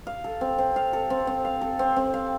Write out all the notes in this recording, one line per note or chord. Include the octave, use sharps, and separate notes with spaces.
F5
A4
C4
C4
F5
A4
C4
C4
F5
A4
C4
C4
F5